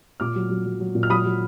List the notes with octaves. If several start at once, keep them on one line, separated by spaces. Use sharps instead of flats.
A#2 D6 F6
F#3
F#3
F#3
F#3
A#2
F6
F#3 B5 D#6
F#3